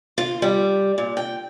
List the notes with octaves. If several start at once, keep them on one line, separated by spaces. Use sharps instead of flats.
F4
G3
A#2
G5